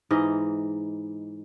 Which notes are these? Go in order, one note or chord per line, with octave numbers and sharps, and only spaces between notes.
G#2 E3 D#4 D#5